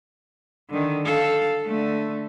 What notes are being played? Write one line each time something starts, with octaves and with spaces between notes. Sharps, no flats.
D3 D#3
A4 F5
D3 A3